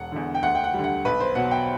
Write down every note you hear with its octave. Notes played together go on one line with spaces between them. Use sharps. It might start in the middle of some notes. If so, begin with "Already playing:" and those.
Already playing: E1 F#5
E2 D3
G5
D2 F#5
G5
F#5
G3
D3
F#5
B1 B4
C5
B2 F#3 F#5
G5